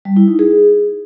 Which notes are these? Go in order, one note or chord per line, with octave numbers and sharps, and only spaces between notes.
G3
E4
D#4
G#4